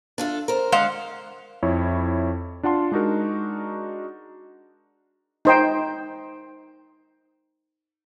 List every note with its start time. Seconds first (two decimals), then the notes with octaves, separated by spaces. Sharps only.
0.18 D4 F4 A4
0.48 A#4 C5
0.72 D3 G#3 F5 F#5
1.63 F2 E4 C#5
2.63 D4 F4 F#5 A5 C6
2.92 G#3 D4 D#4 F#4 A#4
5.45 D#4 C5 G5